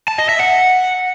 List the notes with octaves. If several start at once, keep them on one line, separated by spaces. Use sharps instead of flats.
A5
D#5
E5
F#5